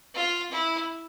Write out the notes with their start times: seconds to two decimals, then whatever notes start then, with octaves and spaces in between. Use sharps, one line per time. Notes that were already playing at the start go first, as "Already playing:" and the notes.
0.15 F4
0.52 E4